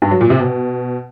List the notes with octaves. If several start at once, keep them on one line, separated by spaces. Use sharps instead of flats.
G2
F#3
A#2
C3
B2